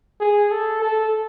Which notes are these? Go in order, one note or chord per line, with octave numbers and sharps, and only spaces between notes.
G#4
A4
A4